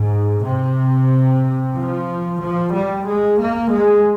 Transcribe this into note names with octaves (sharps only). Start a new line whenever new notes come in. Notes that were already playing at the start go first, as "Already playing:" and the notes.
Already playing: G#2
C3
F3
F3
G3
G#3
A#3
G#3